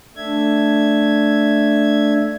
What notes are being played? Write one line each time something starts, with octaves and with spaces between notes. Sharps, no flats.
A3 D4 E5 G#6